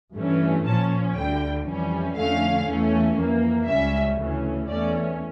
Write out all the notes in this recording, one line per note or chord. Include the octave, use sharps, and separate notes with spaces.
G2 E3 A3 C#4
A#2 F3 C#4 A5
D2 D3 G3 G5
F2 E3 G3 C#4
F2 D3 A3 C#4 F5
E2 E3 A3 C#4
F2 E3 A#3
C#2 C#3 G3 C#4 E5
D2 C#3 E3 A3 C#4
E2 E3 A3 C#4 D5